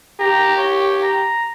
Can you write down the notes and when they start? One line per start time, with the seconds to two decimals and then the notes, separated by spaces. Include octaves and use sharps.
0.20 G4 A#5
0.57 C#5
1.03 A#5